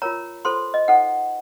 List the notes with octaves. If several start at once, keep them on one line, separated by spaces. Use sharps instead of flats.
F4 A#4 C#5 A#5
F4 A4 C5 C6
D#5
D#4 A4 C5 F#5